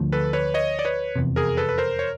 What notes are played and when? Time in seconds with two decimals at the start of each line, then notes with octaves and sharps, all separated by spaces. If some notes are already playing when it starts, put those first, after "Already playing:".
Already playing: D2 D3 F3 A3
0.12 A4 B4
0.33 B4 C#5
0.54 C#5 D#5
0.79 D5
0.85 B4 C#5
1.16 F1 E2 C3
1.36 G#4 A#4
1.57 A4 B4
1.69 B4
1.78 A#4 C5
1.99 C#5